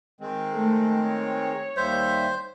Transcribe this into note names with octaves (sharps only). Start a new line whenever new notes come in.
D#3 G#3 C4
A3
C#5
D#2 G3 C5 E5